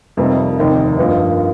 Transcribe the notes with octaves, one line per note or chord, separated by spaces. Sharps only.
F2 C3 G3 A#3 D#4
F1 D#2 D#3 C4 D#4
G2 F3 A#3 D#4